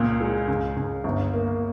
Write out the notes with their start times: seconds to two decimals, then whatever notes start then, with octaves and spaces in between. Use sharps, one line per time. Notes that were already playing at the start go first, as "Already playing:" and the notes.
Already playing: C#2 A#2
0.21 G#3
0.48 C#2
0.77 C#2
1.04 G1
1.33 A#3